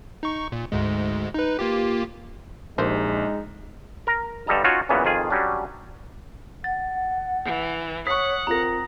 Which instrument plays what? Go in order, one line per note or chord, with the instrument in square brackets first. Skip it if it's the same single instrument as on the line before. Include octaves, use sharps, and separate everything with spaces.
[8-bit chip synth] D#4 C#6
A#2
D2 G#2 G#3
D#4 B4
A#3 F4 G4
[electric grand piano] A#1 [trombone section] G#3 D#4 [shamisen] G4 A#4 C5
[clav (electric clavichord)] A#4 A#5
G2 D3 G3 A4 D#5 A#5
C#4 D#4 F4 F#4 C#5
F#2 A#2 C#3 E3 B3
F2 D#3 F4 G#4
F#3 G3 C#4 D4
[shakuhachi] F#5 [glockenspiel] A6
[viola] E3
[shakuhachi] C#5 [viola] F#5 [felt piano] C#6 B6 [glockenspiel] D#6
[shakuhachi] C4 [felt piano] F4 A#4 [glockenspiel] A#5 A#6